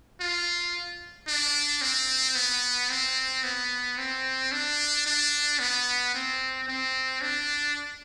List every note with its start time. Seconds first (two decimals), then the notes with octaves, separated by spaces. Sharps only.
0.20 F4
1.28 D4
1.82 C4
2.36 B3
2.90 C4
3.44 B3
3.98 C4
4.52 D4
5.06 D4
5.60 B3
6.14 C4
6.68 C4
7.22 D4